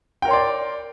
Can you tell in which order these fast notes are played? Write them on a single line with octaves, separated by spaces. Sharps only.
G5 A#4 C#5 C6 D5